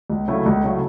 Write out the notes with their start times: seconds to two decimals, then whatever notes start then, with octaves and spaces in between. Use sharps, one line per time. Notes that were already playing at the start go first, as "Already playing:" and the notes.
0.10 C#2
0.28 C#3 F#3 A3 E4
0.46 C#2
0.64 C#3 F#3 A3 E4